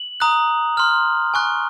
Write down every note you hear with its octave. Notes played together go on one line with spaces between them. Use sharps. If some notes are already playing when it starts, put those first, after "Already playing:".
Already playing: F#7
A#5 D#6 F#6
C6 F6
G#5 C#6 F#6